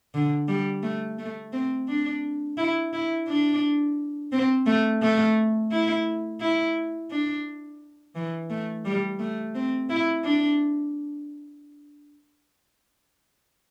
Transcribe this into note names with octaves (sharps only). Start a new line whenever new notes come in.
D3
G3
A3
A3
C4
D4
E4
E4
D4
C4
A3
A3
E4
E4
D4
E3
A3
G3
A3
C4
E4
D4